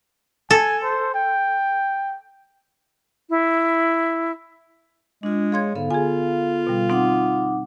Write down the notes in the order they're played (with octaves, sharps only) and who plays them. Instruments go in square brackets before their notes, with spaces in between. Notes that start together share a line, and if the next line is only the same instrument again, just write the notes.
[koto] A4 [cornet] G#5
[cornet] C5
G5
[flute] E4
[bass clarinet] G#3 [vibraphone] D4 F4
[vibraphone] G#4 C#5 [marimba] F5 C6 G#6
[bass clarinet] G#2 [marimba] D3 [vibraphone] B3 A4 F5
[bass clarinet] F4 [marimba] G#4 G#5
[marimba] B2 G3
[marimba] C4 [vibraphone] D#4 F#5 D6